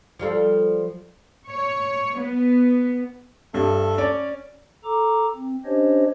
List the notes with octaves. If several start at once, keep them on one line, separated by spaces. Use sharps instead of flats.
F3 G3 A4
C#5
B3
G2 A3
C#4 C#5 D5
A4 A#5 D6
C4
C#4 D4 G4 C5 C#5 D#5